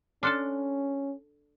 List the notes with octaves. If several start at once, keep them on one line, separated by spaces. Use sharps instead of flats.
C#4 D4 A4 A5 C6 F6 F#6